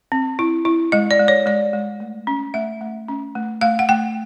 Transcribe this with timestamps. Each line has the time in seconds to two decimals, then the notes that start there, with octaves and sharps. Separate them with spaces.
0.12 C4
0.39 E4
0.65 E4
0.92 G#3 D#5
1.11 D5
1.20 G#3
1.28 C#5
1.46 G#3 D5
1.73 G#3
2.00 A3
2.27 C#4
2.54 A3 E5
2.81 A3
3.08 C#4
3.35 A3
3.61 A3 F5
3.79 F#5
3.89 A3 G5